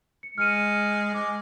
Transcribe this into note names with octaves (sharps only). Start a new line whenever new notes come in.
C#7
G#3 F6 C#7 D#7
G#3 D6